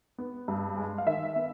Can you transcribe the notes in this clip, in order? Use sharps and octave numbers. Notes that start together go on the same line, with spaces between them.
B3
G2
G#3
F5
D#3 E5
B3